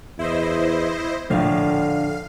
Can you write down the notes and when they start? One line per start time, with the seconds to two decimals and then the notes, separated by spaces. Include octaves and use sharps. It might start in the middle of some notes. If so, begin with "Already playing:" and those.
0.19 E2 E4 C5 D#5
1.30 A#1 A2 D3 F5